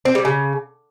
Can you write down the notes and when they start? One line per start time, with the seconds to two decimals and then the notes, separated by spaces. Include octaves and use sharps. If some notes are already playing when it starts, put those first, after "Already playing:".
0.05 C4
0.15 G3
0.25 C#3